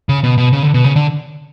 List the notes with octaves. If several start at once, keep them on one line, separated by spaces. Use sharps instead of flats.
C#3
B2
B2
C#3
D3
B2
C#3
D3